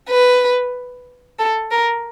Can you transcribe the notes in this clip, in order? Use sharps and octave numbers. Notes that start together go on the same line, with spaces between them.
B4
A4
A#4